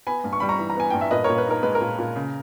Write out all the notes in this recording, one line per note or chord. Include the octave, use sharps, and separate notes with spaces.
B3 G#5 B5
G2
C#6
G3 B5
A#5 C#6
E3
A#5
B3 G#5
G2 G5
E5
A#2 B4 D#5
A#4 C#5
A#2
B4
D#4 A#4
G#3 B4
A#4
A#2
A#2
C#3